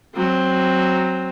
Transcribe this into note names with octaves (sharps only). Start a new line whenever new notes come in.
F#3 C4